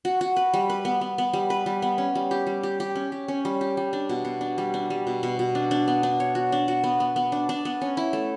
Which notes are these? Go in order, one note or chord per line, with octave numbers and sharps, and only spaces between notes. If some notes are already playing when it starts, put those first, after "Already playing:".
F#4
F#4
B4
G3
B4
B3
B3
B3
G3
B4
G3
B3
C#4
G3
G4
G3
G4
G4
C#4
G4
C#4
G3
G4
G3
D4
B2
B2
D4
G3
D4
G3
B2
B2
B2
D4
D4
B3
D4
C#5
F#4
D4
F#4
B3
B3
B3
D4
D4
B3
C#4
E4
A3